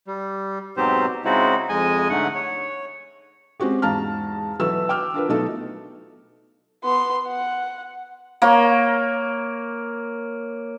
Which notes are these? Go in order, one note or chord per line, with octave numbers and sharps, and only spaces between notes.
G3
G#2 B2 F#3 C4 G4 C5
C#3 G#3 C4 D#4 E4 F#4
F2 G#3 D#5 G#5
G#2 D3 A3 F#5
C#5
G#3 C4 C#4 F#4 G4
E2 G#2 F5 A5 A#5 F6
B1 E3 F#4 A4 B4 E6
G5 D6 F6
D4 F4 A#4 B4
B2 F#3 A3 D#4 F4 A4
B3 C6
F#5
A#3 C#5